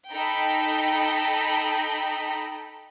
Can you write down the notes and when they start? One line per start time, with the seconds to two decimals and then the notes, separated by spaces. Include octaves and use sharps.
0.11 D#4 A4 G5 A#5 B5